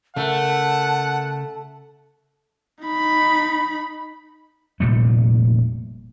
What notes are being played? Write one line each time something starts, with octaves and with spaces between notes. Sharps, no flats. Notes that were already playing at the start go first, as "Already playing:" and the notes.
C#3 A3 A#4 F#5 A5
D#4 B5
F1 A#2 G3 A3